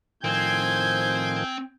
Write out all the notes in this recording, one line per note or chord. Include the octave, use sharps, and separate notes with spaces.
A2 D#3 F3 C4 G#5 G6 G#6